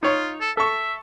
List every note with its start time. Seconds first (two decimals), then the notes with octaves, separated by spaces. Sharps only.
0.03 D#4 F4 C#5
0.41 A4
0.57 A4 E5 C#6